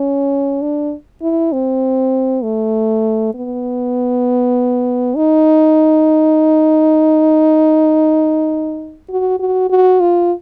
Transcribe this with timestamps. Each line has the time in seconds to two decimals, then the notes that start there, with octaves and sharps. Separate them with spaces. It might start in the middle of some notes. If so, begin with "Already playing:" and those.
Already playing: C#4
0.62 D4
1.22 E4
1.52 C4
2.43 A3
3.34 B3
5.16 D#4
9.09 F#4
9.40 F#4
9.70 F#4
10.00 F4